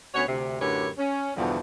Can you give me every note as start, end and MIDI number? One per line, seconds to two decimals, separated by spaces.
0.15 0.23 38
0.15 0.23 59
0.15 0.23 61
0.15 0.23 66
0.15 0.23 73
0.28 0.58 38
0.28 0.58 48
0.60 0.89 42
0.60 0.89 45
0.60 0.89 50
0.60 0.89 67
0.60 0.89 71
0.60 0.89 73
0.98 1.31 61
1.36 1.59 40
1.36 1.59 43
1.36 1.59 47
1.36 1.59 50
1.36 1.59 52
1.36 1.59 53